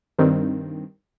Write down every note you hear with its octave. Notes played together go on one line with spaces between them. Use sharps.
G2 D#3 C4